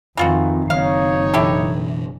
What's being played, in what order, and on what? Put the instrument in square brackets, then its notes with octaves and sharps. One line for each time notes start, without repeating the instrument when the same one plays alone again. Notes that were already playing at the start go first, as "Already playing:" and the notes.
[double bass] F2 D#3 [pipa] E3 F4 F#4
[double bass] F#1 [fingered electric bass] D#3 C4 [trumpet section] D#4 C#5 [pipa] F5
[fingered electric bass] B2 E3 D4 [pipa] E4 G4 A4